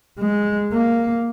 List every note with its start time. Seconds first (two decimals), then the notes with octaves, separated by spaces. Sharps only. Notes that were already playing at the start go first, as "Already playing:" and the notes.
0.19 G#3
0.73 A#3